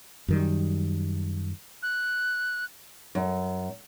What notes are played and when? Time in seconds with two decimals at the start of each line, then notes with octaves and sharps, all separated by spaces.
0.28 F#2 D#3 G3
1.83 F#6
3.15 F#2